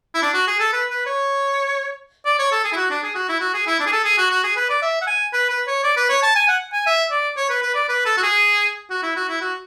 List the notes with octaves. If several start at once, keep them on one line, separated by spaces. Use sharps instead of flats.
E4
D4
F#4
G#4
A4
B4
B4
C#5
D5
C#5
A4
G#4
E4
F#4
D4
G#4
F#4
E4
F#4
G#4
E4
D4
G#4
A4
G#4
F#4
F#4
G#4
B4
D5
E5
F#5
G#5
B4
B4
C#5
D5
B4
C#5
A5
G#5
F#5
G#5
E5
D5
C#5
B4
B4
D5
B4
A4
F#4
G#4
F#4
E4
F#4
E4
F#4